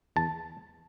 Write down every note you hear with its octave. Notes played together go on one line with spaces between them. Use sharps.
E2 A5